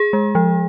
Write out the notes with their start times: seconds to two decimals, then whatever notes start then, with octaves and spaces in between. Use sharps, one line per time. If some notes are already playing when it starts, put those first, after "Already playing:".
Already playing: G#4
0.13 G#3
0.35 F3